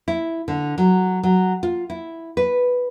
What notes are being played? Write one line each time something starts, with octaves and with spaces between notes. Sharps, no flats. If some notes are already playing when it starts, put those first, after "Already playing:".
E4
D3
F#3
F#3
F4
E4
B4